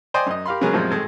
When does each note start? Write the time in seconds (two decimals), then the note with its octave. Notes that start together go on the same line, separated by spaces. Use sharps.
0.14 C5 D5 D#5 G5 G#5 C6
0.26 F#2 D#5
0.46 G4 A#4 F5 B5 C6
0.61 C#3 F#3 G#3 B3 G#4 A#4
0.73 F#2 A#2 F3 G3 G#3 C4
0.91 G#1 G#3 A3